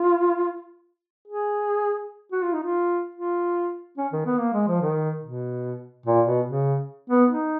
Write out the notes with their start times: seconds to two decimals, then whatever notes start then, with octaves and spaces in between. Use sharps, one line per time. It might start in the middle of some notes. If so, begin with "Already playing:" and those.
Already playing: F4
1.28 G#4
2.32 F#4
2.42 F4
2.53 D#4
2.63 F4
3.15 F4
3.97 C#4
4.12 D#3
4.26 B3
4.39 A#3
4.53 G#3
4.67 F3
4.81 D#3
5.23 B2
6.06 A#2
6.27 B2
6.47 C#3
7.10 B3
7.30 D#4